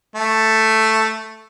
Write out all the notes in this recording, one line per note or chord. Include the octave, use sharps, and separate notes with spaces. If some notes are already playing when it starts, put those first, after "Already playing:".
A3